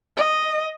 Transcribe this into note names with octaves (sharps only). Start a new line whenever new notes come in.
D#5